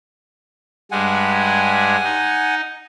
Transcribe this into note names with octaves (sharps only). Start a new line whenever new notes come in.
G2 G3 G#3 F#5 G#5
D#4